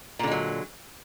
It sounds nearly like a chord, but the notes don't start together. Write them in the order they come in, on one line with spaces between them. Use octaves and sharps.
A#2 D3 G#3 F#3